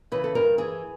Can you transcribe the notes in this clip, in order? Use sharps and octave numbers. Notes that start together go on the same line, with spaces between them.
C#3 E3 B4
A4
G2 A#4
E3 G#4